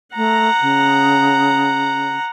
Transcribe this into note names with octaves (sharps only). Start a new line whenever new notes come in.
A3 F#5 A#5
C#3